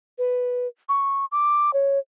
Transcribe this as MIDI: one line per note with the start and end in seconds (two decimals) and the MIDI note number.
0.18 0.67 71
0.89 1.25 85
1.32 1.73 86
1.73 1.99 73